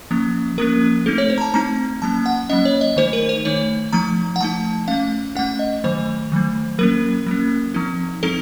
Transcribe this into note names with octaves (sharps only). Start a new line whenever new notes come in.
F3 A#3 C#4
F3 A#3 C#4 A#4
A3 C4 D#4 A4
C#5
C5
A#5
A5
A3 C4 D#4 A#5
F#3 A#3 C#4 A5
F#5
F#3 A#3 C#4 D#5
C#5
D#5
D#3 A3 D#4 C5
A#4
C5
D#3 A3 D#4 C#5
F3 A3 D#4 A#5
F#5
F3 A3 D#4 A5
A3 C#4 F5
A3 C#4 F#5
D#5
D#3 F#3 A3 C5
D#3 F#3 A3
F#3 A#3 C#4 A#4
F#3 A#3 C#4
F3 C4 D#4
F3 C4 D#4 A4